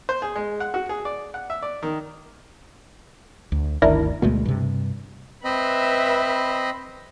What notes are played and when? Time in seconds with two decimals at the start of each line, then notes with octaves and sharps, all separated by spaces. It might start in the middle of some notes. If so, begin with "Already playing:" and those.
0.09 C5
0.22 G#4
0.36 G#3
0.60 F#5
0.74 F#4
0.89 G#4
1.05 D5
1.34 F#5
1.50 E5
1.63 D5
1.82 D#3
3.52 D2
3.82 G1 D2 D#3 D4 E4 A#4
4.22 D2 B2 G#3 A3
4.46 G2 C3
5.45 C4 B4 D#5 E5 B5